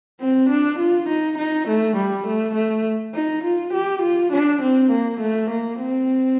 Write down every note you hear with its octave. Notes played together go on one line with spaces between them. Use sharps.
C4
D4
F4
D#4
D#4
A3
G3
A3
A3
D#4
F4
G4
F4
D4
C4
A#3
A3
A#3
C4